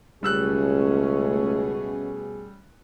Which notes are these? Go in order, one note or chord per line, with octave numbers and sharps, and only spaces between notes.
C#2 B2 G3 A3 C#4 G#4 E6 F#6